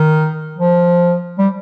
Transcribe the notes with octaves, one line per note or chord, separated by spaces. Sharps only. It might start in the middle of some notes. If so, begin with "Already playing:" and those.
Already playing: D#3
F3
G3